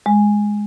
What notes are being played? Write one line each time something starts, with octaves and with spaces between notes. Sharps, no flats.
G#3